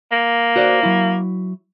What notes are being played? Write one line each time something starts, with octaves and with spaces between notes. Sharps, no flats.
A#3
F#4 C5 D5
F#3 E4